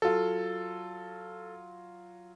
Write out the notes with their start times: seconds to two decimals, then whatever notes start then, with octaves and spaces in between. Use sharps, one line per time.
0.02 F#3 F4 A4